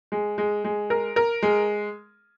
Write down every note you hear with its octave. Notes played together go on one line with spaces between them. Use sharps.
G#3
G#3
G#3
A#4
A#4
G#3